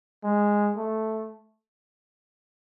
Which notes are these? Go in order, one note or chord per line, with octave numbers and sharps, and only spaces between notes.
G#3
A3